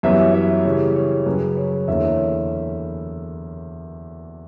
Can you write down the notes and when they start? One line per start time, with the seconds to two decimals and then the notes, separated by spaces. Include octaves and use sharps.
0.03 F#2 E3 G3 B3 C#5 E5
0.34 C#5 E5
0.65 C#3 E3 G3 C#5
0.96 C#5
1.26 F#2 C#3 F#3 B4
1.57 C#5
1.88 E2 D3 A#3 C#4 E4 C#5 E5